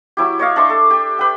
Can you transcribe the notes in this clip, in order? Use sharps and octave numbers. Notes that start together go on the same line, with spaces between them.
F#3 E4 G4
C#5 D#5 F5
D4 E5 C6 C#6
A4
G4
B4 G5